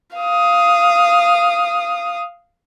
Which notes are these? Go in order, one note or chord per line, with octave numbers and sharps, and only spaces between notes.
F5 D#6